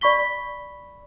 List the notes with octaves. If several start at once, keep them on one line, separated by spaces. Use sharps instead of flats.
D5 B5 C#6 B6 G7